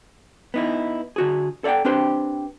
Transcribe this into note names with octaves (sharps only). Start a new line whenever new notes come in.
B3 D#4 E4
D3 F#4 G#4
A4 D5 E5 F#5 G5
C4 D4 G4 B4 C5